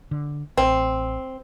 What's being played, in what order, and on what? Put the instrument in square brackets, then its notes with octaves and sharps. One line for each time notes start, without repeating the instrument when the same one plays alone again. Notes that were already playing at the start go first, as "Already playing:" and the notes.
[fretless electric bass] D3
[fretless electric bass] A1 [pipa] C4